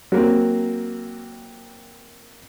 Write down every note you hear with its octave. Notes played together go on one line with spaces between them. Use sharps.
F#3 A#3 C4